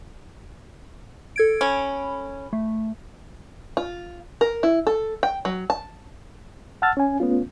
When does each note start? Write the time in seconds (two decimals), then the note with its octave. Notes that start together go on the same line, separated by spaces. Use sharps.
1.36 A4 G#6 D7
1.61 C#4 B5
2.53 A3
3.77 F4
4.41 A#4
4.63 E4
4.87 A4
5.23 G5
5.45 F#3
5.70 A5
6.82 F#5 A5 E6 F6 A6
6.97 C#4 G#5
7.20 A3 B3 C#4 F4